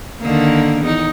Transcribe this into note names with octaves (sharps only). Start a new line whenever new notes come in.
D3 D#3 A#3
E2 D#4